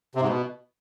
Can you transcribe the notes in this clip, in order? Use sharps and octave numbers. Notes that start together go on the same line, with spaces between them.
C3
G#2
B2